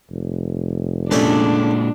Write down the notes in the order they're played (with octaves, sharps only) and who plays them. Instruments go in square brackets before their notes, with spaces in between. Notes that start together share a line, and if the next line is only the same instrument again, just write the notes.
[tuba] F1
[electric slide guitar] A#2 G#3 [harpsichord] A3 C#4 D5 [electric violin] D4